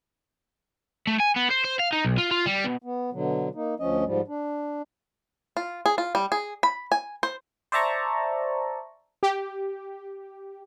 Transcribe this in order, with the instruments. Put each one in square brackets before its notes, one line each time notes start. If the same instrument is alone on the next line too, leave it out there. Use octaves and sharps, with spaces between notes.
[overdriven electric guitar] A3
G#5
B3
C5
C5
F5
D#4
B1
F4
F4
G3
B2
[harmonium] B3
B2 D3 F#3
A#3 D#4
D2 F3 C#4 D#5
G#2 F3 G3
D4
[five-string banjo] F4
G#4
F4
G3
G#4
B5
G#5
C5
[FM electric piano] C5 D5 E5 A5 A#5 C#6
[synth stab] G4